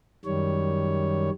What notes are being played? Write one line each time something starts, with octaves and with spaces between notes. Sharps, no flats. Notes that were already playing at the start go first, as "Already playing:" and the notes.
F#2 D#3 G3 C#5